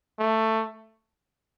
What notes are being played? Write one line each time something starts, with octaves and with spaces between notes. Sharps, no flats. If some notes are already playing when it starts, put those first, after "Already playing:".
A3